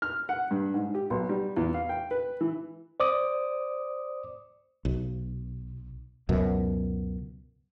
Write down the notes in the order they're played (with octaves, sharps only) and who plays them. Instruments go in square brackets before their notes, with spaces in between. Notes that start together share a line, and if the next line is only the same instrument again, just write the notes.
[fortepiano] F6
F#5
G2
G#2
G4
B1
G3
E2
F5
G5
B4
E3
[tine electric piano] C5 D5 D6 D#6
[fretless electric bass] B1
C#2 F#2 B2